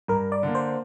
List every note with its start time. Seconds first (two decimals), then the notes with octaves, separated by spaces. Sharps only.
0.08 G2 A#4
0.32 D5
0.43 D3 A#3
0.55 C5